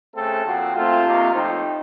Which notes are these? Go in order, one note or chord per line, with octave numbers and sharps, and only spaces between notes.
C#3 A3 C4 A4
A#2 F3 C4 F#4
A#2 A3 C4 F4
C3 D#3 A#3
A2 F3 C4 D#4